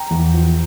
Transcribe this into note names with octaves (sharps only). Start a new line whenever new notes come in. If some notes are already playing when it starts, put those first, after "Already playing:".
Already playing: G5 A#5
E2
F3